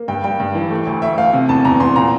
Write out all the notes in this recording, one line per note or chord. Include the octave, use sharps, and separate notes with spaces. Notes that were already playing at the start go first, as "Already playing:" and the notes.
Already playing: A#3
G2 G5
G3 G5
G2
E3
A3
D2
D2 E5
A3 F5
C3
E2 A5
E2 A#5
E2 C6
A#2 A#5